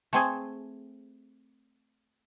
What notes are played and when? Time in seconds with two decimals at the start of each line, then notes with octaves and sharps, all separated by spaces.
0.13 A3 C4 G#4